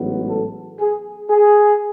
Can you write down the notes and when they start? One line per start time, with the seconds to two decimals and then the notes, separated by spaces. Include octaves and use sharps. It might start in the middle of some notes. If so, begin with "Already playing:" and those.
Already playing: A1 G#2 F#3 B3
0.29 A4
0.80 G#4
1.30 G#4